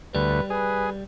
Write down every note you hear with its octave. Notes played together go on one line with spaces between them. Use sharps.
D2 G3 B4
G#4 B4